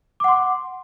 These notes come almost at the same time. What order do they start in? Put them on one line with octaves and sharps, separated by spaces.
D6 F#5 C6